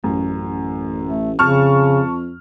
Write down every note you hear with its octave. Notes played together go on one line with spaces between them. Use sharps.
A1 F#2
A3
F2 C#3 A5 C#6 F6